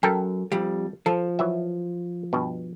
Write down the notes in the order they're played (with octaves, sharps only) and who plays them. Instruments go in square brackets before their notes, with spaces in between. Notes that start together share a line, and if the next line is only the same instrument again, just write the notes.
[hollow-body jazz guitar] F#2 [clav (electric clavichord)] A4 A#4 G5
[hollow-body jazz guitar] F2 G3
[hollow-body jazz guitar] F3 [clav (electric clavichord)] A4
[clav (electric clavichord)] E3 F#3 E5
G2 B2